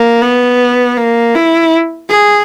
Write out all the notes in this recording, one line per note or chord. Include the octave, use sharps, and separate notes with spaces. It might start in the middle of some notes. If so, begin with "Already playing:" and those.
Already playing: A#3
B3
A#3
E4
G#4